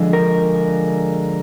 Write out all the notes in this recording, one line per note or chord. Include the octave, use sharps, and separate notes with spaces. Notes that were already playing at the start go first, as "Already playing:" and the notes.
Already playing: D3 F3 G#3
A#4